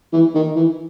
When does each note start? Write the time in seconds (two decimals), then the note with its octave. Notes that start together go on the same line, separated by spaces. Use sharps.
0.13 E3
0.34 D#3
0.56 E3